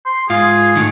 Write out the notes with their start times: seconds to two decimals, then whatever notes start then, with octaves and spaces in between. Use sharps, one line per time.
0.06 C6
0.30 G#2 F4 G#4
0.75 A2 D3 D#3